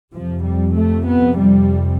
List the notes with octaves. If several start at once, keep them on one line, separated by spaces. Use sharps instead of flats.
F2 C3 F3
G3
A3
B3
G3